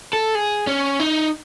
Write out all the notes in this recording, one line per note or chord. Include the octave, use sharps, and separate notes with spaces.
A4
G#4
C#4
D#4